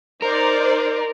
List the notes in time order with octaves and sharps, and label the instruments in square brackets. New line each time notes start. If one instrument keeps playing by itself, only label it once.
[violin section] D#4 C5 D5 [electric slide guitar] A#4